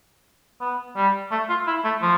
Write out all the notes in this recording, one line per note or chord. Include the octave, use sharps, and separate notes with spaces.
B3
G3
A3
F4
E4
A3
F3